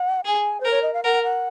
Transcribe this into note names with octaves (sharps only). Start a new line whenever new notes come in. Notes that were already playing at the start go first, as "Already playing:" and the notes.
Already playing: F#5
G#4 G#5
A#4 C5
C#5
D#5
F5
A#4 F#5
F#5